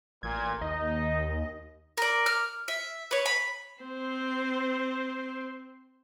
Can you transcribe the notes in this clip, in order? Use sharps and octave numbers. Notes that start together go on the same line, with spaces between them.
A1 A#2 G#6
D#2 D#4 D#5
A#4 D5
F6
E5
B4 C#5
B5
C4 C5